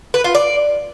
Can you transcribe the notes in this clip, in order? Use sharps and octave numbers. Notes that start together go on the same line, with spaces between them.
B4
F4
D5